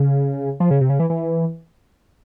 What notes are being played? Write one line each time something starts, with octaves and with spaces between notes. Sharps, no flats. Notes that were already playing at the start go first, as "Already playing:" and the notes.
Already playing: C#3
F3
C#3
C3
C#3
E3
E3